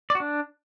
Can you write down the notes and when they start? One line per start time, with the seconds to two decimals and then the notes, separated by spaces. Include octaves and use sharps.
0.10 D5
0.15 F#4
0.20 D4